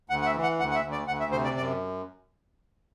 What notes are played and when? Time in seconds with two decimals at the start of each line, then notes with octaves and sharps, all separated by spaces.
0.10 D2 F#5
0.22 F#5
0.26 E5
0.35 E3
0.43 F#5
0.59 D2 F#5
0.71 F#5
0.75 E5
0.83 D2
0.92 D5
1.07 D2 F#5
1.20 E5
1.32 C3 C5
1.44 D5
1.56 F#2 D5